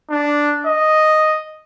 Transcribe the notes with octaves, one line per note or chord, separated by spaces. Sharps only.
D4
D#5